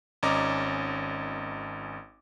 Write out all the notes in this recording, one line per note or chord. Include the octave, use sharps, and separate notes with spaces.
G#1 C#4 D#5 A#5 D6